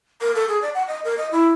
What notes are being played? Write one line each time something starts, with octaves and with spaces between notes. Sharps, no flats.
A#4
A4
G#4
D5
F#5
D#5
A#4
D#5
E4